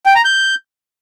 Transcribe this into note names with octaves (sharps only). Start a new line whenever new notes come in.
G5
A#5
G6